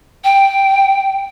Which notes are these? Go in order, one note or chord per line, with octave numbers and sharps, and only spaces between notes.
G5